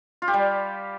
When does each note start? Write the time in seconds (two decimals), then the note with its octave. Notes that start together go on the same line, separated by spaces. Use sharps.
0.22 F4
0.28 G4
0.33 G3